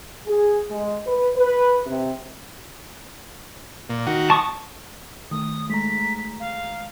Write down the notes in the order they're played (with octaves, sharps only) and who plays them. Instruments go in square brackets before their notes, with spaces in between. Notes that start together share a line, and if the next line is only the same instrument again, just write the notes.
[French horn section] G#4
G#3
B4
B4
C3
[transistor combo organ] A#2
D#3 F#4
[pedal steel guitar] A5 C#6 D#6
[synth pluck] D#3 A3 [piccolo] D#6
[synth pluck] G#3 A3 A#5 [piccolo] B6
[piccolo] F5